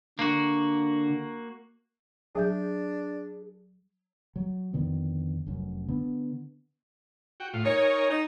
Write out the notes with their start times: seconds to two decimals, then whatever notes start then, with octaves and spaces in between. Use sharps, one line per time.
0.19 D3 A#3 F#4
2.35 F#3 D4 G#4 E5 G6
4.36 F#3
4.73 F2 D3 D#3 B3
5.47 F1 F#2
5.88 D3 B3
7.40 F#4 G5
7.53 A2 F4
7.65 D#4 A#4 C#5 G#5
8.10 D#4